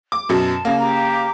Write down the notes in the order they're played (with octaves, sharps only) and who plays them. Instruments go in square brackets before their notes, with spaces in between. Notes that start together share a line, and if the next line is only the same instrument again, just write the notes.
[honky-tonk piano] D6
[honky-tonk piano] F#2 B2 [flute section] A5
[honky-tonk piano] C#3 A#3
[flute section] G4 A#5 D6